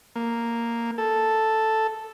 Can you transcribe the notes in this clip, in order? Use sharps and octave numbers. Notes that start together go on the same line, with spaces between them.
A#3
A4